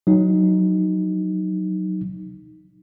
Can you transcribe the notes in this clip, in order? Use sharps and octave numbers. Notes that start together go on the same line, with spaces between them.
F#3 D#4